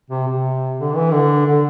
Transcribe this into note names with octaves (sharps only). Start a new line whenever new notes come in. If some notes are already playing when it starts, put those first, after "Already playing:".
C3
C3
D3
E3
D3
D3